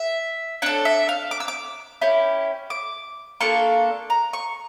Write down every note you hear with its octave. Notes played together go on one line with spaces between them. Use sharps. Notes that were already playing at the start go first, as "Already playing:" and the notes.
Already playing: E5
D4 A4 C#5
E5
F5
D6
E6
D6
C#4 E4 G4
D6
A#3 D4 F4 A4 C#6
A#5
C#6